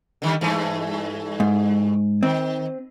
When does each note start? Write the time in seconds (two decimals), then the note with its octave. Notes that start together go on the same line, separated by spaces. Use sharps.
0.22 D3 D#3 G3
0.41 G2 E3 A3
1.40 G#2
2.23 D#3 C4